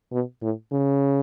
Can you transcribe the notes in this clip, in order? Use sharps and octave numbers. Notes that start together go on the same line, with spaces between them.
B2
A2
C#3